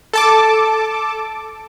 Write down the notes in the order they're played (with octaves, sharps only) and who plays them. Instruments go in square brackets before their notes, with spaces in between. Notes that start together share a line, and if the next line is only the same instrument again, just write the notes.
[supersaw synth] A4 A5 D6